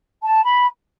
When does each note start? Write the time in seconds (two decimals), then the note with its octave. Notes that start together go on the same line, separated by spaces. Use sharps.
0.23 A5
0.44 B5